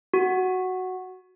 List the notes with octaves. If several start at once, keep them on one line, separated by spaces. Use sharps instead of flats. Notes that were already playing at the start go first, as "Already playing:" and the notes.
F#4